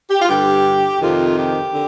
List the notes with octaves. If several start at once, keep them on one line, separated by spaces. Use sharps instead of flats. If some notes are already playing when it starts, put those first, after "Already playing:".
G4
F4
G2 D3 G4
F2 C3 D#3 F4
G4
D3